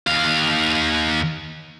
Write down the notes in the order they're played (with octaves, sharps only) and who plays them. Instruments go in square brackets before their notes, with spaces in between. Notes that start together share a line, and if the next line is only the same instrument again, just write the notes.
[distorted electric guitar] D#2 F5